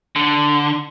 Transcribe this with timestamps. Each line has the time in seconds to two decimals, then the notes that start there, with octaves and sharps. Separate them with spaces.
0.16 D3